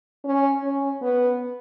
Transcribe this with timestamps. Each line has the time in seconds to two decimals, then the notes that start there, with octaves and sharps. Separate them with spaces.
0.25 C#4
0.64 C#4
1.02 B3